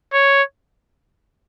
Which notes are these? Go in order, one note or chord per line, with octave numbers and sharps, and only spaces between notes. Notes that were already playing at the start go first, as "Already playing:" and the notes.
C#5